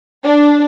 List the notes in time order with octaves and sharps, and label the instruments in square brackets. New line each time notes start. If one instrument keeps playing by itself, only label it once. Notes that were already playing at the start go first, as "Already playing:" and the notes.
[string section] D4